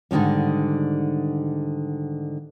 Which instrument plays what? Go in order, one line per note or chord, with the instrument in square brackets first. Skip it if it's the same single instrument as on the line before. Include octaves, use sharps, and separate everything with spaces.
[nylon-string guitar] G#2 D3 D#3 F3 G3